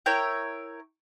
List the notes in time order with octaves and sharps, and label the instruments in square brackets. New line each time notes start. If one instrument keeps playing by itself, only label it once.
[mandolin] E4 A#4 C#5 G5